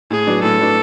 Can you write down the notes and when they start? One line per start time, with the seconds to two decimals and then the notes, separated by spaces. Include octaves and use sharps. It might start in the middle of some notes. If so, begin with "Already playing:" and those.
0.11 A2 G#4
0.27 F#3 B3 D4
0.43 A2 A4
0.60 F#3 B3 D4